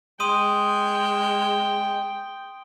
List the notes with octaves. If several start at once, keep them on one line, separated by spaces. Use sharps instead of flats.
G#3 G5 C6 D#6 D#7